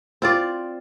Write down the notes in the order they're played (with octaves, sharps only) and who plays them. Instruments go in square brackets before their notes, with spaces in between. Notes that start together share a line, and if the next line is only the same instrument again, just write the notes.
[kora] C4 F4 D5